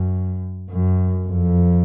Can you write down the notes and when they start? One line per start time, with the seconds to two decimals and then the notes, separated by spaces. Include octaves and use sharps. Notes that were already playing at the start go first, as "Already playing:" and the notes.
Already playing: F#2
0.69 F#2
1.27 F2